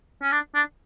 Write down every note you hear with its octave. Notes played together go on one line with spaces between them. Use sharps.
C#4
D4
D4